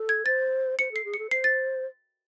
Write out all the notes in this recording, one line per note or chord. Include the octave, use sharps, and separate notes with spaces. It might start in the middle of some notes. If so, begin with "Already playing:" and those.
Already playing: A4
G#6
C5 A6
C5 C#7
A4 C7
G#4
C#7
A4
C5 C7
A6